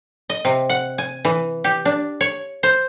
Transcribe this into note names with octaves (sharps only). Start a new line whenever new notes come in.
D#5
C3
F#5
G#5
E3
G4
D4
C#5
C5